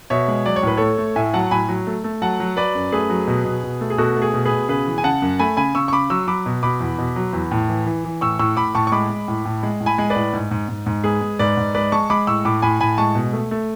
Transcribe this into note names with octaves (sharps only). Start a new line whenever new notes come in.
B2 C#5 E5
G#3
F#3 D5
C#5
A2 B4
A3 A4 C#5
A3
A2 E5 G#5
F#3 F#5 A5
A2 G#5 B5
F#3
A3
A3
F#3 F#5 A5
F#3
F#3 B4 D5
F#2
A3 G#4 B4
F#3
B2
B2
B2
A3
G#4
B2 F#4 A4
A3
G#4
B2
G#4 B4
B2
C#3 G#4 B4
E3
G#5
C#3 F#5 A5
F#2
A3 G#5 B5
C#3 G#5 B5
C#3 C#6 E6
C#6
C#3 B5 D6
F#3 C#6 E6
F#3 B5 D6
B2
B2 B5 D6
E2
B2
F#3
E2
A2
E3
E3
E3
A2 C#6 E6
A2 C#6 E6
A2 B5 D6
A2 A5 C#6
C#6
G#3 B5 D6
G#3
A2
A2
G#3
A2
G#5 B5
G#3
B4 D5
A2
G#2
G#2
G#2
G#2
G#3 G#4 B4
G#3
G#2 B4 D5
G#2
G#3 B4 D5
G#3 A5 C#6
G#3 B5 D6
A2 C#6 E6
A2 B5 D6
A2 G#5 B5
A2 G#5 B5
G#3 A5 C#6
B2
A3
A3